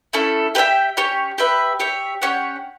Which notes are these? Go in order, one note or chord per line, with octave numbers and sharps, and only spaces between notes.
A3 C#4 E4 A4
G4 B4 E5 G5
C#4 G4 C#5
G4 B4 E5
G4 C#5 E5
C#4 G4 C#5 F#5